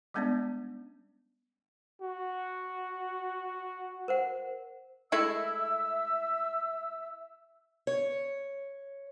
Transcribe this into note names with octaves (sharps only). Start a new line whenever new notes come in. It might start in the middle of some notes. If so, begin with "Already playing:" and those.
G3 G#3 B3 C#4 D4 D5
F#4
A#4 C5 F#5
G#3 A3 E4 E5 E6
C#5